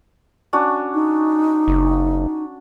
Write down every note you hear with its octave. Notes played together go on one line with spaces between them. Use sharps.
C#4 D4 F#4
D#4
F#1